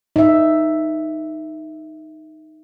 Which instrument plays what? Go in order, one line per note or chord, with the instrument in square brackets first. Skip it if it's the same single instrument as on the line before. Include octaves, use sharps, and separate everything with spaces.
[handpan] D#4 E5